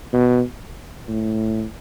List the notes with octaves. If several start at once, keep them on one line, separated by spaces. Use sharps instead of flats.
B2
A2